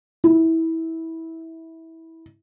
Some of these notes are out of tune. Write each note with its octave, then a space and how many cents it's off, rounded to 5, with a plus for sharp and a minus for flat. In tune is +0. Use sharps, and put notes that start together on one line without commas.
E4 -20